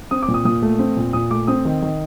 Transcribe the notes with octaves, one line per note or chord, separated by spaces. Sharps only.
C4 D#6
D6
A#2
D#6
A#2 D#6
A3
C4
A#2
A#2 D#6
A3 D6
C4 D#6
D#3
D#3